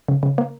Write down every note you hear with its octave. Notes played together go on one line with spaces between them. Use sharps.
C#3
C#3
A#3